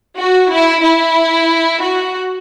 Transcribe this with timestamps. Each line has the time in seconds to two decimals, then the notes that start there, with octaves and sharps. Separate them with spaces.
0.18 F#4
0.50 E4
0.82 E4
1.82 F#4